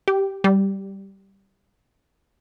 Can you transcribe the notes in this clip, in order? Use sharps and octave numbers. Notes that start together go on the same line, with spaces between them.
G4
G3